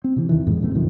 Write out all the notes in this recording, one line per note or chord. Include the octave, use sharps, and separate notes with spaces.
C4
C3 E3
E2 D#3 E3
F2 A2 E3 G#3
A1 F2 C3 A3
B1 F#2 D#3 F3